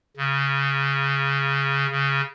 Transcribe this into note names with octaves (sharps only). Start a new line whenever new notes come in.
C#3
C#3